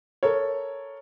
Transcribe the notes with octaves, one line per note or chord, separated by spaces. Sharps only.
A4 A#4 C#5